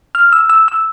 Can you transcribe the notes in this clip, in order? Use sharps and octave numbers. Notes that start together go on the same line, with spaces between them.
F6
E6
E6
E6